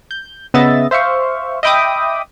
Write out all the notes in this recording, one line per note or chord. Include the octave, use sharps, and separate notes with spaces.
G6
C#3 B3 D#5 E5 A6
C5 E5 F5 C#6
D#5 E5 G5 B5 D6 D#6